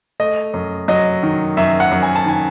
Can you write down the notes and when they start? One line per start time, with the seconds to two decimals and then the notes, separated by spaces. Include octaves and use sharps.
0.20 A3 D#5
0.54 F#2
0.88 F#3 D#5
1.23 D#3
1.57 F#2 E5
1.80 F#5
1.91 F#2
2.03 G#5
2.15 A5
2.26 D#3 G#5